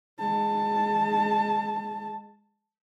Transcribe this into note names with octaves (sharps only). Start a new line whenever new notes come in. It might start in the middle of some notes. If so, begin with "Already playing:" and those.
G#3 A5